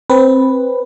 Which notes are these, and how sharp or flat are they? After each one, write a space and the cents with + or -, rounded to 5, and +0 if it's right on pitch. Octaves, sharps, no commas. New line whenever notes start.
C4 +10 B4 +0